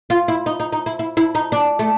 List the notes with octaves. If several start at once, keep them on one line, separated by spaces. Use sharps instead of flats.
F4
E4
D#4
D#4
D#4
E4
E4
E4
D#4
D4
A3